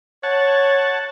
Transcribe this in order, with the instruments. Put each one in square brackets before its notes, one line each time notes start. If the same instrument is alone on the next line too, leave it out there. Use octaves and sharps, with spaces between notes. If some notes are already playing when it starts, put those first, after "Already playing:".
[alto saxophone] C#5 [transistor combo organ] F#5 A5